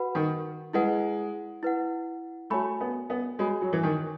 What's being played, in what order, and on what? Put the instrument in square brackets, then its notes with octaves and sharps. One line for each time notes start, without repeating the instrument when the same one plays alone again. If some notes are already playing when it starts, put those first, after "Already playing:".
Already playing: [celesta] F#4 B4 F#5 B5
[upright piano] D#3
[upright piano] G#3 [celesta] E4 B4 F#5
[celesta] E4 B4 F#5
[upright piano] A3 [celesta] F#4 C#5 G#5 B5
[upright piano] B3
B3
[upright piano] G#3 [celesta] F#4 C#5 G#5 B5
[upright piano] F#3
E3
D#3